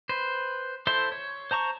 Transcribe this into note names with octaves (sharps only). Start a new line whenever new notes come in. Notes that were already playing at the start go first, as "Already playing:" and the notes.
B4 C5
E4 A4 C5 E5 C6
C#5
C5 A5 A#5 C#6